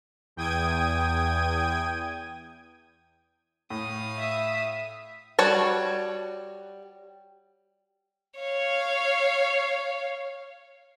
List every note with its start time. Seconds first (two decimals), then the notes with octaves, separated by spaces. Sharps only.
0.36 E2 G5 D#6 G#6 D#7
3.70 A2 F5 D#6
4.18 E5
5.39 G3 F#4 C#5 A5
8.40 C#5 F5